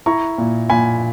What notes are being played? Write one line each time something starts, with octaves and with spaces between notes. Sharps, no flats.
E4 A#5 C#6
A#2
A#2 G#5 B5